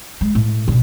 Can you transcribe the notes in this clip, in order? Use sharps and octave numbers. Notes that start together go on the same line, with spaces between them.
G#3
A2
B2 D3